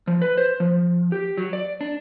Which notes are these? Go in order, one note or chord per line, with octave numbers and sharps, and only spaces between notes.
F3
B4
C5
F3
G4
F#3
D5
D4